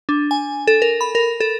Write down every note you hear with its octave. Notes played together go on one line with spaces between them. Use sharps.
D4
G#5
A4
A#4
B5
A#4
A4